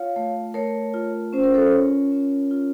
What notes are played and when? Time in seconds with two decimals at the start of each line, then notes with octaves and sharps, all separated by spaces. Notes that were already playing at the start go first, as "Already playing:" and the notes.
Already playing: F4 C#5 F5
0.16 A3
0.54 A3 A#4 C#5
0.94 F4
1.33 C#4 C5
1.44 A#4
1.54 A4 C5
1.72 F4 A#4 C#5
2.12 C#4
2.51 F4